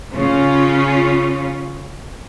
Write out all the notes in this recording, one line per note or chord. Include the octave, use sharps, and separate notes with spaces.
C#3 C#4 F4